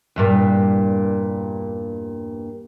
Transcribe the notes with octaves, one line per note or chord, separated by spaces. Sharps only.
E2 G2 A#2